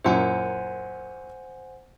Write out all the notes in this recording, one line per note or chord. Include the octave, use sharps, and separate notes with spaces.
F#2 A#2 E4 C5 F#5 G#5